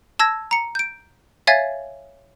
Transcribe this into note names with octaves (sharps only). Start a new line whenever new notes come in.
A5 E6 G#6 A#6
A#5 C#7
G6 D7
C#5 E5 F5 G#5 G#6 A6